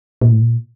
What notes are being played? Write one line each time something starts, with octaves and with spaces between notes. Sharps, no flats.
A#2
A2
A#2